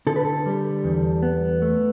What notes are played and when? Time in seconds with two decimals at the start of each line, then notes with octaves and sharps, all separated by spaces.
0.07 D3 A4
0.16 B4
0.25 A4
0.46 G3
0.84 E2
1.23 B3
1.62 A3